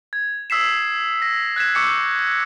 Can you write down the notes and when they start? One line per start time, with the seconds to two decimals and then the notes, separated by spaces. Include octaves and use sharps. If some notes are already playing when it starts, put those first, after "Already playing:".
0.13 G#6
0.50 D#6 E6 B6 C7 E7
1.22 A#6
1.56 F#6 G#6 B6 E7
1.75 C#6 D6 E6 G6 C#7